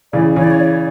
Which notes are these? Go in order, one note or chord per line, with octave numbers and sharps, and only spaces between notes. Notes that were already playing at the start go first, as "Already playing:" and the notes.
C#3 E3 D5
C#3 E3 C#5
D5
C#5
D5
C#5